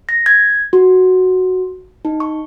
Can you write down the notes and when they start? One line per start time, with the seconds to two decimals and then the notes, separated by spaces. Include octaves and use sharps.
0.09 A#6
0.26 G#6
0.73 F#4
2.05 D#4
2.20 C#6